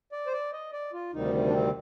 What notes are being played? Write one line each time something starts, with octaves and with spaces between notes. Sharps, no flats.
D5
C5
D5
D#5
D5
F4
D2 C3 D#3 G3 D#4
D4
C4